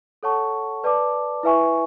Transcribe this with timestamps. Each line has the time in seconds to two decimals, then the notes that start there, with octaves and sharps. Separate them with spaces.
0.23 A4 C#5 F#5 A5 C#6
0.84 B4 D5 A5 D6
1.43 E4 B4 E5 G#5 C#6